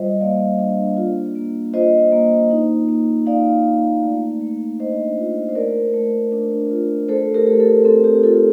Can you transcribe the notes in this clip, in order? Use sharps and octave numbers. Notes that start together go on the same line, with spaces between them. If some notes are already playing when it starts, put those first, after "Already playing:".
Already playing: G3 F4 C5 D#5
A#3 D5 F5
D4
F4
A#3
F4 C5 D#5
A#3
D#4
A#3
D#4 D5 F5
A#3
A3
A3
D4 C5 D#5
F4
C5
A3 A#4 D5
A3
D4
F4
A3 A4 C5
G4 A#4
A3
A4
C4 A4
G4
F4 A4